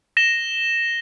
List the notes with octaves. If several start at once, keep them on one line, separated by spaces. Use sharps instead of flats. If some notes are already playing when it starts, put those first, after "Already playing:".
A#6 E7 G7